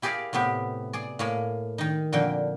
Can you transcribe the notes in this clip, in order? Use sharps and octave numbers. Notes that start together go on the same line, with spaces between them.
E4 G4 G#4 A#4 D5 F5
A2 C3 B3 G4
G#4 D5
A2 A#3 G#5
D#3 D#4
F2 A#2 D3 A#4 G5